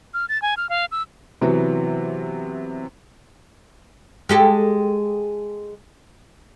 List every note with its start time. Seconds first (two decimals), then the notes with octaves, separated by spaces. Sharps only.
0.14 F6
0.29 A6
0.42 G#5
0.57 F6
0.69 F5
0.91 E6
1.41 C3 E3 F#3 B3
4.29 G#3 G4 A4